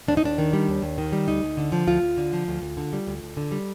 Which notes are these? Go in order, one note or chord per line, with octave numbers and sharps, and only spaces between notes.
D#2 D4
D#4
D#2 D4
D#3
G3
D#2
D#2
D#3
G3
D2 D#4
D2
D3
F3
D2 F4
D2
D3
F3
D2
D2
D3
G3
D2
D2
D3
G3